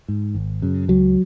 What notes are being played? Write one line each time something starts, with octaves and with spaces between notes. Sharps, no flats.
G#2
G#1
F#2 C#3
C#2 F#3